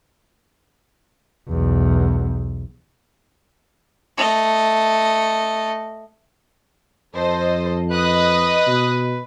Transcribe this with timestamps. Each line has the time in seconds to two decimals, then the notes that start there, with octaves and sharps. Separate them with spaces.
1.49 B1 E2
4.17 A3 D#5
7.15 F2 A4 C5 D#5
7.92 B4 D#5 D#6 F#6
8.67 B2